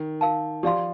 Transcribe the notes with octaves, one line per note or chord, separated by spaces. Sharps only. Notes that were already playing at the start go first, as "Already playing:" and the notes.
Already playing: D#3
A#4 F5 A5
F3 G4 D5 F5 C6